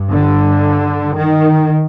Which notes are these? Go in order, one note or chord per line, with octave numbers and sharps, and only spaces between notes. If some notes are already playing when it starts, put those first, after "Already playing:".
Already playing: G2
D3
D#3